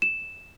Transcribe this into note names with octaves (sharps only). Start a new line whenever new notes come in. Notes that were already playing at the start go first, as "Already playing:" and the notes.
E7